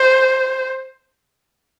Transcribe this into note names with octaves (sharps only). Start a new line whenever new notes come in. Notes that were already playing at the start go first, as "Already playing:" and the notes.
Already playing: C5